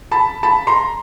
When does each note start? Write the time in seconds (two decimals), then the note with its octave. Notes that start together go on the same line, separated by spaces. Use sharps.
0.11 A5 B5
0.43 A5 B5
0.67 A#5 C6